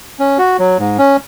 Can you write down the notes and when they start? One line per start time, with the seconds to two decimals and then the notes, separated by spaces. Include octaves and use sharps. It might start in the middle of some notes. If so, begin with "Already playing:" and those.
0.19 C#4
0.38 F#4
0.59 F#3
0.79 G#2
0.98 C#4